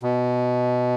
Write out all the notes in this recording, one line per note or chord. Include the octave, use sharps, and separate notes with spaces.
B2